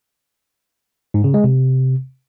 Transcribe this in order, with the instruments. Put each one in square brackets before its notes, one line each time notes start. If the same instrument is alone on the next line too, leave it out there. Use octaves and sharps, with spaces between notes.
[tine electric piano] G#2
C#3
G#3
C3